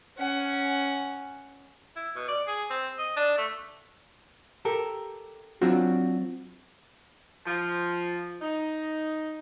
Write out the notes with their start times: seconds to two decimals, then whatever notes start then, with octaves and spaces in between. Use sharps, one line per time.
0.18 C#4 F#5
1.96 E4
2.16 B2
2.28 D5
2.47 G#4
2.70 C4
2.98 D#5
3.17 D4
3.37 A3
4.65 G4 A4 A#4
5.62 F#3 C4 D4 F4 F#4
7.46 F3
8.42 D#4